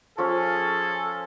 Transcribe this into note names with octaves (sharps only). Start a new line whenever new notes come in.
F3 C#4 G#4 A4